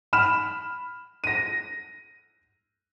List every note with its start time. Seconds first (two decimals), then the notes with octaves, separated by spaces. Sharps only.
0.13 B5 F6 E7
1.24 A#6 D#7